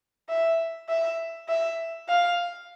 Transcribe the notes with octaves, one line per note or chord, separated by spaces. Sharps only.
E5
E5
E5
F5